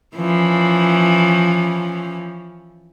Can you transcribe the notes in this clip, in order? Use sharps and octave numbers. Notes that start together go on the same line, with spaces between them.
E3 F3 C#4